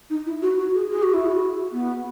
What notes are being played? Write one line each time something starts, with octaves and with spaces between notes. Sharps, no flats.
D#4
E4
F#4
F#4
G#4
G#4
F#4
E4
F#4
B3